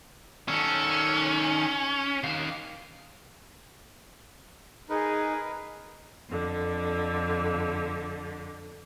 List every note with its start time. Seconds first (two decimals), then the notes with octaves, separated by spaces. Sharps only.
0.48 D#3 C#4 A4
2.23 D#3 F5
4.90 D#4 G#4 A#4 B4
6.28 F2 D3